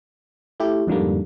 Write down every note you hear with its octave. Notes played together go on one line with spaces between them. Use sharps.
A3 E4 G4
F2 G#2 D3 G3 A#3